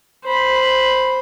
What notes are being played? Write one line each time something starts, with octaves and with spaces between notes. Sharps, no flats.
C5 B5